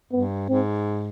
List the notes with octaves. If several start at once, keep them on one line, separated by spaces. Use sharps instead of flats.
G2 B3
G#2 C4